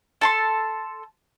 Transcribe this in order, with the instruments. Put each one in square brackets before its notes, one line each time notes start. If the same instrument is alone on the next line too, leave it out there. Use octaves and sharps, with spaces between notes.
[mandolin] A4 A5 C6